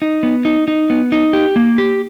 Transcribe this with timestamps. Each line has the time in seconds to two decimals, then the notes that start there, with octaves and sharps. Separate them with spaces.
0.02 D#4
0.23 B3
0.45 D#4
0.68 D#4
0.90 B3
1.12 D#4
1.33 G4
1.56 A#3
1.78 G4